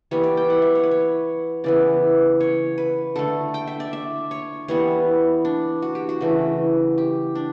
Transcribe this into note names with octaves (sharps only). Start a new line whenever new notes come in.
E3 G3 B3 C#5
D5
G5
F#5
E5
C#5
B4
C#5
C#3 E3 B3 D5
C#5
B4
D3 A3 A4
G5
E5
D5
E5
C#5
E3 G3 B3 C#5
D4
F#4
G4
F#4
C#3 E3 A3
G4
D4